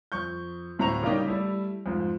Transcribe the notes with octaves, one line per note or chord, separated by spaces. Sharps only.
F2 C#6 G6
D1 A2 C5 A#5 C#6 F7
C#3 G3 A#3 D#4 G4
G3 A3 E4
F2 G#2 F3